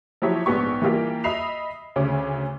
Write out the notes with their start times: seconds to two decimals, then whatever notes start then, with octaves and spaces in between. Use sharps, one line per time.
0.22 F3 F#3 E4 G4 C#5
0.46 A#1 G#2 B3 G4 C#6
0.82 E3 G3 A#3 F4 G4
1.24 D#5 E5 B5 D#6 C7 F7
1.96 D2 C#3 C#4 D6